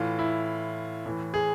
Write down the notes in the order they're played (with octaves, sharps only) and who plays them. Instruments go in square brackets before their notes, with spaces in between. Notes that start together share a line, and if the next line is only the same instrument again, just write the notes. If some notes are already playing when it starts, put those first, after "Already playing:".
Already playing: [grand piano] A2 E3 F4
E4
A2 E3
G#4